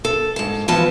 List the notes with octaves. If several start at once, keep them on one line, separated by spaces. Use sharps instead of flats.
A4
G#2 A5
E3 F3 B3 A5